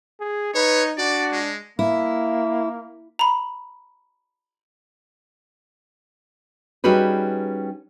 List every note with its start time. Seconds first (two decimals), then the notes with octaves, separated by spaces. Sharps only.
0.20 G#4
0.54 D#4 B4 C#5
0.97 D4 F#4 D5
1.32 G#3
1.79 A#3 E4
3.19 A#5 B5
6.84 G3 C#4 D#4 F#4 G#4 B4